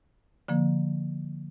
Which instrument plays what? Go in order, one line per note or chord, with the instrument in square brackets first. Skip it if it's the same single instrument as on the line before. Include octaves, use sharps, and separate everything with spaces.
[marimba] D3 F3 A#3